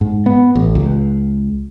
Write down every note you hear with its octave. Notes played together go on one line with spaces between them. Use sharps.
G#2
B3
A1
C#2